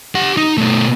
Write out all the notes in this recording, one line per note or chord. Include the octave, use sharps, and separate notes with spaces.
G4 F#5
D#4
B2 A3